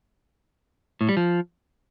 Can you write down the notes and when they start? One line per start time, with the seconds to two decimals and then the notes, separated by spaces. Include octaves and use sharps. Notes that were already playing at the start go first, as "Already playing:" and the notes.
1.01 A2
1.09 G3
1.17 F3